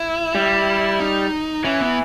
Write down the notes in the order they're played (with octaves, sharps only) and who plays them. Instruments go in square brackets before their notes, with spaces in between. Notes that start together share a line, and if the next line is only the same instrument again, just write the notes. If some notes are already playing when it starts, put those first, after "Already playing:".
Already playing: [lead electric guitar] E4
[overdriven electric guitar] G3
[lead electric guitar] D#4
[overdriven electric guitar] E3 [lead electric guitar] C#4
[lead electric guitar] B3